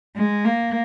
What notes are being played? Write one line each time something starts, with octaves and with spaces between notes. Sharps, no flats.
G#3
A#3